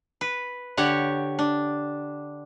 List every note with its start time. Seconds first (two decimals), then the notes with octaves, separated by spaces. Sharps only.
0.21 B4
0.77 D3 G4 C#5 F#5
1.39 D4